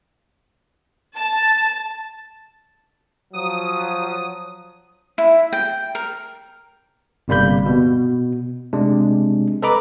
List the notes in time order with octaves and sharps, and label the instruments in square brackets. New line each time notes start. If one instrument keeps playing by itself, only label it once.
[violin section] A5
[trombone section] F3 F#3 [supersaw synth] D#6
[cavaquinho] E4
G5
A#4
[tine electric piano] G1 C3 G3 A#3 B5 G6
B2
C3 G#3 D4
A4 B4 D#5 A#5 B5 D6